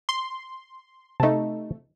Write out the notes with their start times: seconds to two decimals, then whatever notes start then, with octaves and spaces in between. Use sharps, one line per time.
0.09 C6
1.20 C3 A3 D#4 A5